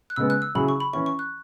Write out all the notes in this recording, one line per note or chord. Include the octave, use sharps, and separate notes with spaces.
F#6
C#3 G#3 B3 E6
F#6
E6
C#3 F#3 E4 G#4 B5
C#6
B5
E3 C#4 E4 C#6
C#6
F#6